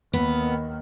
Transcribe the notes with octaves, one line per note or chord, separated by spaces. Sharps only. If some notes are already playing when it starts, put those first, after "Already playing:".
D#2 D#3 B3